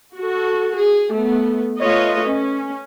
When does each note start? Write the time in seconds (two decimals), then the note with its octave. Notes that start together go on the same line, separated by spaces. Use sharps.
0.17 F#4 A4
0.76 G#4
1.13 A3 B3
1.79 A3 F4 B4 C#5 D#5
2.24 C#4